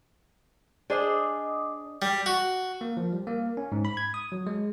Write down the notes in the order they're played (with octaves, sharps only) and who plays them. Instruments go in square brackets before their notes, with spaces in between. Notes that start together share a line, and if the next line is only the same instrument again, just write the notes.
[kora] D4 G#4 C5 [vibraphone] D#5 D6 D#6
[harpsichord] G3
F#4
[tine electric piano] A#3
F3
G3
A#3
C#4
G#2
B5
G#6
D#6
F#3
G#3